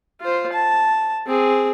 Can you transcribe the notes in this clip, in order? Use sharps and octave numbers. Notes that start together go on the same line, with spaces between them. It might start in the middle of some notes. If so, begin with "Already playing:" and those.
F4 C5
A5
C4 G#4